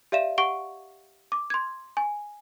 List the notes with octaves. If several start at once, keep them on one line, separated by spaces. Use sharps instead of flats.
G4 D5 E5 F5 E7
G4 F#5 C#6 D7 G7
D6
C6 G#6
G#5